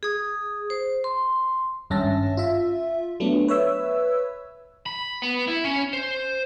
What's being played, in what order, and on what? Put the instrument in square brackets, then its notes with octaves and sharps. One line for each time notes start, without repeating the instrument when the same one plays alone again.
[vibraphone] G#4 D#6
C5
C6
[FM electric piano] G#1 G2 C#4 E5 A5 A#6
F4 E5
F#3 A3 B3 D4
B4 C#5 E5 E6
[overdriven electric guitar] B5
B3
E4
C#4
C5